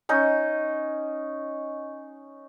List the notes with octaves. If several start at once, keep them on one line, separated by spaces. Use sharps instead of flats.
C#4 D#4